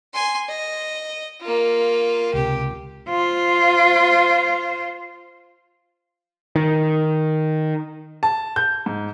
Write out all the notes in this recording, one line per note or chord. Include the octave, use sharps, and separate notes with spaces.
G#5 C6
D#5
A#3 F4
C#2 C3 G4
F4 C5
D#3
A5
G6
G#2